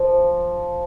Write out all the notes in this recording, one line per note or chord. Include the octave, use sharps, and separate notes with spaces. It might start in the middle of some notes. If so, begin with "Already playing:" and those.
Already playing: F3